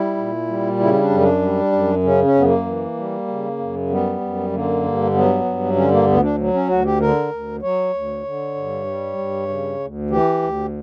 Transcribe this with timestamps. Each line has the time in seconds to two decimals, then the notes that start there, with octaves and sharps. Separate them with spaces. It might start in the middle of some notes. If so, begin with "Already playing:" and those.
Already playing: G3 E4
0.17 A#2
0.48 G3
0.79 C#3 E4
0.94 E4
1.00 D4
1.10 F#2
1.20 D4
1.41 G3
1.72 F#2
2.03 C#3 C#4
2.24 C#4
2.35 F#2 B3
2.45 A#3
2.66 E3
2.97 G3
3.27 C#3
3.59 F#2
3.89 G3 B3
4.21 F#2
4.52 D3 A#3
4.83 G2
5.14 F#3 B3
5.45 G2
5.76 D3 C#4
5.91 A#3
6.07 D2 B3
6.22 D4
6.38 F#3
6.54 C#4
6.69 D2 F#4
6.85 G4
7.00 D3 A#4
7.31 D2
7.62 F#3 C#5
7.94 D2
8.24 D3
8.55 G2
8.86 G3
9.18 G2
9.48 C#3
9.80 D2
10.10 E3 G4
10.42 D2